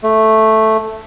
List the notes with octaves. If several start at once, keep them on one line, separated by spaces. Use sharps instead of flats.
A3